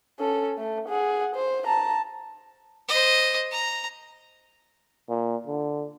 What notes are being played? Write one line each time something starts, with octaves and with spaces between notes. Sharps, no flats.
C#4 A4
A3
G#4 F#5
C5
A5 A#5
C5 D#5
A#5
A#2
D3